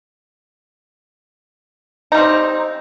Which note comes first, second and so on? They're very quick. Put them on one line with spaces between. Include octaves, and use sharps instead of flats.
D#4 G3 C4